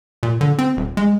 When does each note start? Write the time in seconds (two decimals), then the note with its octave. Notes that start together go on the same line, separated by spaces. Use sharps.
0.23 A#2
0.41 D3
0.59 C4
0.77 D#1
0.97 G#3